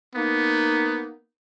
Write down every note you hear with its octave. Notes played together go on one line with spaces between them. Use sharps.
A#3 B3 D#4